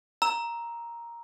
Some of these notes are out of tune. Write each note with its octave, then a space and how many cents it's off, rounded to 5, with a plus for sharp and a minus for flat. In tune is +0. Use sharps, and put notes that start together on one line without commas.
A#5 +5 E6 -10